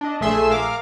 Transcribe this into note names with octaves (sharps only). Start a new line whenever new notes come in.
D4 D#5
A#1 A3 G#4 E5 C6 E6
A#4 F5 D6